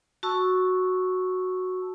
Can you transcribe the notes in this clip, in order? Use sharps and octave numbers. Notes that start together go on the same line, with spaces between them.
F#4 A5 C#6 E6